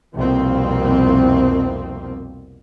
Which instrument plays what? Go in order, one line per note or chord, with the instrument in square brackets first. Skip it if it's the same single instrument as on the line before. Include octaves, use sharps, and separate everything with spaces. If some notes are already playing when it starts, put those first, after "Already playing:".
[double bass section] C2 F2 B2 F3 A#3 C4